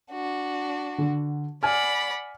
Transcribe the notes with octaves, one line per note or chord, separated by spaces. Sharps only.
D4 F#4
D3
D5 F#5 G#5 B5 F6